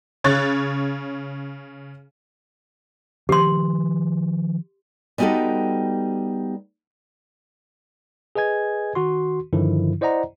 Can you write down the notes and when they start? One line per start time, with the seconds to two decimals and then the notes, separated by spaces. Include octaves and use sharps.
0.24 C#3 C#5 C#6 F#6 A6
3.29 D#3 F3 G4 C6
5.18 G3 B3 D#4 F#4 G4 A4
8.36 G#4 B4 D#5 G#5 G#6
8.95 D#3 F#4 C6
9.53 G2 D3 D#3 F3 E4
10.01 E4 C5 D5 D#5 F#5 A#5